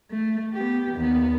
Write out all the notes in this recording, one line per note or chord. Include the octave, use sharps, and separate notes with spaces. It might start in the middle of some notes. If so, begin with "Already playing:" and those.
A3
B3 G4
D#2 B3